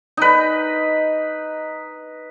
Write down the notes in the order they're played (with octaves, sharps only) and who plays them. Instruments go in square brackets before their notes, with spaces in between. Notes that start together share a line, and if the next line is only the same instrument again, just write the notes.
[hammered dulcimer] D#4 B4